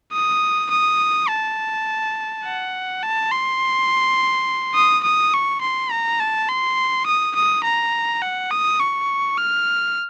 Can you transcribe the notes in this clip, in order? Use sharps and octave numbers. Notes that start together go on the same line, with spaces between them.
D#6
D#6
A5
F#5
A5
C6
D#6
D#6
C#6
C6
A#5
A5
C6
D#6
D#6
A#5
F#5
D#6
C#6
F6